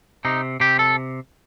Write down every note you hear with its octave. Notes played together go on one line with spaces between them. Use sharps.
C3 D#4
C3 G4
A4